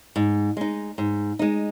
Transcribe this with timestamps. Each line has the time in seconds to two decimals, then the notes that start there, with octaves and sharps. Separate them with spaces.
0.16 G#2
0.57 G#3 D#4
0.98 G#2
1.39 G#3 D#4